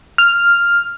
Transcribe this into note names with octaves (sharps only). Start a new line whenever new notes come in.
F6